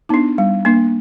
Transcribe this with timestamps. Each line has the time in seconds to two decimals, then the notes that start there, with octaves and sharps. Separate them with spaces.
0.09 B3 D4 D#4
0.38 G3
0.65 A#3 D4